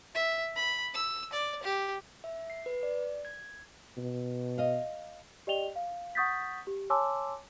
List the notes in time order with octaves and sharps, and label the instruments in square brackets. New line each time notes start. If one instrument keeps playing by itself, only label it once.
[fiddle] E5
B5
E6
D5
G4
[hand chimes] E5
C7
B4
D5
G#6
[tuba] B2
[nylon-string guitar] D#5 F5
[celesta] G4 D5 D#5 G5 F7 G7
F5
F#5 C#6 D#6 G6 A6 B6
G4
C#5 G#5 A5 C6 D6 E6